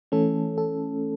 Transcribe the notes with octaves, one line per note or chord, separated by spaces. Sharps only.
E3 A3 C#4 A4
A4